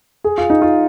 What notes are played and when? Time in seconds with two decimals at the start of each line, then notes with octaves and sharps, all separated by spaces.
0.24 G#4
0.38 F4
0.50 D#4
0.62 F4